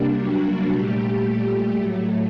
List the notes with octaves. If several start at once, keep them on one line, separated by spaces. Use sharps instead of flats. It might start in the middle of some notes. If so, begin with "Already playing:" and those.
Already playing: C3 G3 A#3 D4
F#3 F#4
A#2 G3 A3 G4
A2 F#3 A3